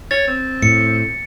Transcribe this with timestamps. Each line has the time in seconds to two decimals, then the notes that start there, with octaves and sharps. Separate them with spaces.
0.11 C#5 A6
0.28 C4
0.62 A2 C#7